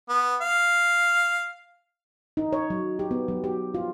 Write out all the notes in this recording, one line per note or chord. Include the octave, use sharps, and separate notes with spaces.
B3
F5
D#4
C#5
F#3
G4
B3
F#3
G4
F4